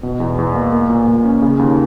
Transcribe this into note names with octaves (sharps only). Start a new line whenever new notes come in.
B2
E2
E2
A#3
A#3
A#2
A#2
C#4
C#3
D#2